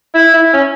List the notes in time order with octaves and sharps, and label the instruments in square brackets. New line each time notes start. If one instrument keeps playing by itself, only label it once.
[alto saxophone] E4
E4
C#4